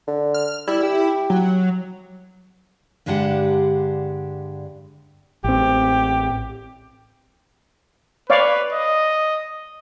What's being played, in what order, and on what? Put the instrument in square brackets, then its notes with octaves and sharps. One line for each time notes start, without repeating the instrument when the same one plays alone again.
[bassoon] D3
[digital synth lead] F6
[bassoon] G3 [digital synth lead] E4
[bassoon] G4
[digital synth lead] F#3
[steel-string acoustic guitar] G2 D3 G#3 D4 G4 F#5
[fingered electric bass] A1 C4 [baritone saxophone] G4
[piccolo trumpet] B4 [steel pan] C#5 D5 F5
[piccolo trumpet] D#5